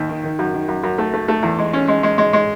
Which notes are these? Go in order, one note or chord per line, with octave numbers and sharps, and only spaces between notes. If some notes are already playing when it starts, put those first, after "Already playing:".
Already playing: D#2
D#3
D#3
F#2
D#3
F#2
F#2
A3
A3
A3
E2
G#3
C#4
G#3
G#3
G#3
G#3